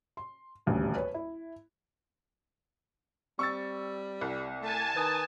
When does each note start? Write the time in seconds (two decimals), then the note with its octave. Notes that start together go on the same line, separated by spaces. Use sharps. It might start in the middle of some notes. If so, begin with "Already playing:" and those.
0.17 C6
0.66 D#1 A1 D2 G3
0.95 B4 C#5
1.14 E4
3.39 G3 C4 C#6 E6 A6
4.21 C2
4.62 A3 G#5 A5
4.96 D#3 B4 D#6